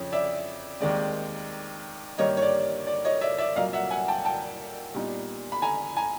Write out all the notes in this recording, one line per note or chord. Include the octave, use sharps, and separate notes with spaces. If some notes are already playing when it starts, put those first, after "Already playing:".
Already playing: F2 C#3 F3 C#4 C#5
D5 E5
D#2 D#3 G#3 C4 D5
G2 D#3 G3 A#3 C#5 D#5
C#5
D5
D5
C#5 D#5
D5 E5
D5 E5
C2 A#2 F#3 A#3 D#5 F5
E5 F#5
F#5 G#5
G5 A5
G5 A5
A#2 G3 B3 D#4
B5
G#5 A#5
G#5 A#5